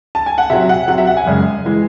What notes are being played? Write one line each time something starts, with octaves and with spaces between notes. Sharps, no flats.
A5
G#5
F#5
C3 F#3 E5
F#5
C3 F#3 F#5
E5
F#5
G#5
F#2 C#3 G#3
E3 G#3